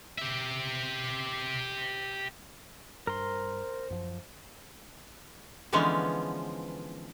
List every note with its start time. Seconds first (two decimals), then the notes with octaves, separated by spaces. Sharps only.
0.18 G4 E5
3.07 G2 A#4 C5 C6
3.90 F#2 F3
5.72 D3 E3 F3 G#3 B3 C#4